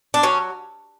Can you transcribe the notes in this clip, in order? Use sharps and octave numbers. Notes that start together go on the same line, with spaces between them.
D4
F#3 C#4